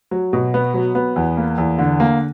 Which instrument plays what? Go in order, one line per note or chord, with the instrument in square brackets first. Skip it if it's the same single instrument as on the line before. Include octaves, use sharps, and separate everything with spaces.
[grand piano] F#3
B2
B3
F#3
B3
E2
A#3
E2
D3
A#3